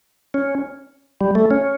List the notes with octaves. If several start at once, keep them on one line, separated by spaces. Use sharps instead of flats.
C#4
G3
A3
C#4